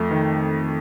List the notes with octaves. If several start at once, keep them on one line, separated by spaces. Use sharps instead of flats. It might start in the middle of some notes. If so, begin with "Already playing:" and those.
Already playing: F2 A3
D#3